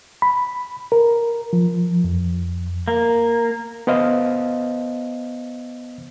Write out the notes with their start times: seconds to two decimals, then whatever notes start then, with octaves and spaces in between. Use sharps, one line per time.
0.22 B5
0.92 A#4
1.53 F3
2.04 F2
2.88 A#3
3.87 B3 C5 D#5 F5